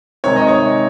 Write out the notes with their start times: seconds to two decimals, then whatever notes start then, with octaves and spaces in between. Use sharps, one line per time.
0.24 C3 D#3 G#3 C#5
0.36 D#5
0.48 C#5